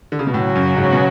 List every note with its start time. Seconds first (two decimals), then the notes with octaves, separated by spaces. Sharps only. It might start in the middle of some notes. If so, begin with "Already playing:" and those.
0.12 D3
0.19 C#3
0.27 B2
0.34 A2 C#3 F#3 C#4 F#4
0.55 F#2
0.76 G#2
0.93 B2